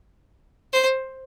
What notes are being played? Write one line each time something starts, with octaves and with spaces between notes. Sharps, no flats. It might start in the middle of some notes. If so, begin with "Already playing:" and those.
C5